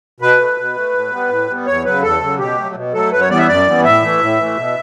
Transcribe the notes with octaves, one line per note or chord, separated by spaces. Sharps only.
B2 B4
A3
B2
A3
A2
G3 B3
A2
G3 B3
E2 C#5
C#3 F#3 B4
E2 A4
C#3 F#3
B2 G4
F#3 A3
B2
F#3 A3 A4
F#2 B4
C#5
E3 G3 B3 D5
E5
F#2 D5
E3 G3 B3
A2 E5
E3 A3
A2
E3 A3
B2